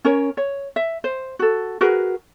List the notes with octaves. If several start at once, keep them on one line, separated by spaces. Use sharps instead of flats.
C#4 A#4 C#5
C#5
E5
C5
F#4 A4
F#4 G#4 A#4 B4